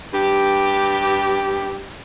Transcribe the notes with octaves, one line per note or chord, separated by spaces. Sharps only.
G2 G4